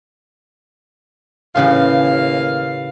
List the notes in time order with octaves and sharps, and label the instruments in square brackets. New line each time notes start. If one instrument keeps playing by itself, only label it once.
[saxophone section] D#2 F5 [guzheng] A2 C#3 E3